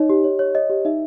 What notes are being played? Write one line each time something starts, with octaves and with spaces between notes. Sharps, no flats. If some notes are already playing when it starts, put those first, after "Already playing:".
Already playing: D#4 C#5 D#5
G4
C#5
C#5
C#5 D#5
G4
D#4 E5